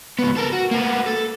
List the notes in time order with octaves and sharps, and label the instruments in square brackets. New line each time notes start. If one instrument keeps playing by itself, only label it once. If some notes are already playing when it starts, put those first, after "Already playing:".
[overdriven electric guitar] C#2 B3
A4 A#4
F#4
A#3 B3
A4